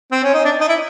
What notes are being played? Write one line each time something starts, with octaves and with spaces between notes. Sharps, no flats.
C4
C#4
D#4
D4
D#4
E4